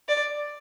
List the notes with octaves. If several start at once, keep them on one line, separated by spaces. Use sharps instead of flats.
D5